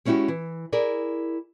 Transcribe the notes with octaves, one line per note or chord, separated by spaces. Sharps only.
G#3 C#4 D#4 E4 F#4 G4
E3
E4 G#4 A#4 D5